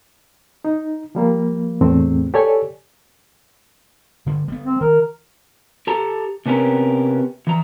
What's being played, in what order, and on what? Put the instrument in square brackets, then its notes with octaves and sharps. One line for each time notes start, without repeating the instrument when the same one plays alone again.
[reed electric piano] D#4
F3 G3 A#3
E2 A2 A3 C4
G4 A4 C#5 D5 G#5
[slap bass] D3 G3
G3 B3
[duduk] C4
[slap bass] D#3 [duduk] A#4
[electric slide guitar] G4 A4 A#5
C3 B3 C#4 G4 A#4
E3 A#5